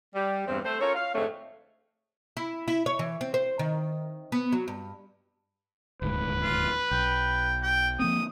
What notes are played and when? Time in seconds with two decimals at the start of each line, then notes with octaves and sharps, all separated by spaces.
0.15 G3
0.47 E2 G2 C4
0.64 A3 C5
0.81 C#4 F4 A4 A#4 C#5
0.95 F5
1.15 F2 G#2 D3 A3 C4 C#5
2.37 E4
2.68 E4
2.86 C#5
2.99 E3
3.21 C4
3.34 C5
3.59 D#3
4.32 B3
4.52 F#3
4.68 G2
6.02 D#1 D2 G#2 B4
6.41 F4
6.91 B1 G5
7.63 G5
7.99 F3 A#3 C4 D#6